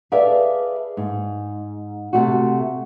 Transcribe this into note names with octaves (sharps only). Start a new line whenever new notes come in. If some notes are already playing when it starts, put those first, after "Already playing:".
G#4 A4 B4 D5 E5 F5
G#2
C3 A3 F#4